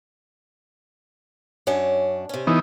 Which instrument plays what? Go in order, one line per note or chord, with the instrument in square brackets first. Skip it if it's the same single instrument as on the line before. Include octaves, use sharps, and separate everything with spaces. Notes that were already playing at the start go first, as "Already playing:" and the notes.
[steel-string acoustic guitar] F#2 C#4 D4
C3 C#4
[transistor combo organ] E3 B3 D#4